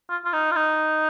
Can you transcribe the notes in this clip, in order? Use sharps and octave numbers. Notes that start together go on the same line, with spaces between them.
F4
F4
D#4
F4
D#4